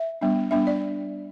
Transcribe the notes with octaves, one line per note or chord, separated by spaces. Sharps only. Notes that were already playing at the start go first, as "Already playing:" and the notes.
Already playing: E5
G3 B3 D4
G3 B3 D4 E5
D5